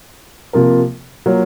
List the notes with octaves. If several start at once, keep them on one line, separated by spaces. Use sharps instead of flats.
C3 F3 A#3 F4 A#4
F#3 A#3 F4 A#4